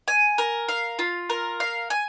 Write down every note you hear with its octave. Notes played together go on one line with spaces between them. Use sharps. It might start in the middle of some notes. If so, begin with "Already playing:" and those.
G#5
A#4
F5
F4
A#4
F5
G#5